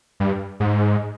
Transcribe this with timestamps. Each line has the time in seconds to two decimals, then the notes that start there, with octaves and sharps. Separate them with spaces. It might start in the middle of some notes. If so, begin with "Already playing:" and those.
0.20 G2
0.60 G#2